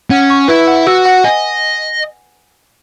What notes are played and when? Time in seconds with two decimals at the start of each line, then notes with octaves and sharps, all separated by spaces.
0.10 C#4 F#5
0.30 C#6
0.48 E4 B4
0.67 F#5
0.87 F#4 E6
1.05 F#5
1.24 D#5 G#5